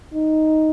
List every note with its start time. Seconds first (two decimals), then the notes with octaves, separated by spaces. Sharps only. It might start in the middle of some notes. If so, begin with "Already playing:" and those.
0.14 D#4